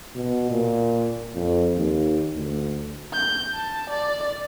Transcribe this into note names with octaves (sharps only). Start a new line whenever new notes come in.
B2
A#2
F2
D#2
D2
G6
A5
D5